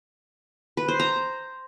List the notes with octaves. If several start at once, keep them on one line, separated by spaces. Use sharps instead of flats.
B4
C5
A#5